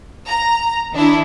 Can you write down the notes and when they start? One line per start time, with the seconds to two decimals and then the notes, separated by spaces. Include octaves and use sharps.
0.28 A#5
0.92 D#3 D4 E4